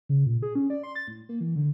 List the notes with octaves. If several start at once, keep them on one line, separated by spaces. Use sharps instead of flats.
C#3
A#2
G#4
C#4
D5
C6
A6
A2
A#3
E3
D3